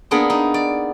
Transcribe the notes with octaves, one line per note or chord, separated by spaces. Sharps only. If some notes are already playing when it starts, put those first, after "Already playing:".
A#3 B3 D4 G#4 D5
D#4
D5